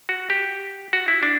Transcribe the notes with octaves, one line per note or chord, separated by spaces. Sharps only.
F#4
G4
F#4
E4
D4